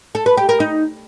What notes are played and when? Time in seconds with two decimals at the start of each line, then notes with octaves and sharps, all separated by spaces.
0.15 A4
0.26 B4
0.37 G4
0.49 A#4
0.60 D#4